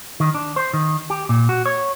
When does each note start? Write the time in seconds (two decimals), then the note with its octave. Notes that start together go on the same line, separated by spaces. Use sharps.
0.20 D#3
0.34 D4
0.56 C5
0.73 D#3
1.10 G4
1.29 A#2
1.49 F#4
1.66 C#5